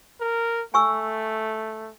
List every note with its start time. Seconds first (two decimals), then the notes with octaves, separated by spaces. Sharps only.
0.20 A#4
0.74 A3 G#5 C#6 E6